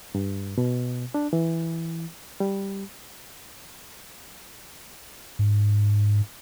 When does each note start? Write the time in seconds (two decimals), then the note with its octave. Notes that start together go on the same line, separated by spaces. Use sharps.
0.15 G2
0.58 B2
1.14 D4
1.33 E3
2.40 G3
5.39 G#2